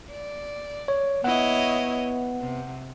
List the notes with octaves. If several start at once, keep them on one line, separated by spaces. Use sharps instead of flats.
D5
C#5
B3 E4 C#5 D#5 F#5
C3